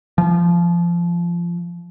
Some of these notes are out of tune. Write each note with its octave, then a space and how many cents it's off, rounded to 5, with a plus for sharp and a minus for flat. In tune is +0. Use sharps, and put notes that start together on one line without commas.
F3 -20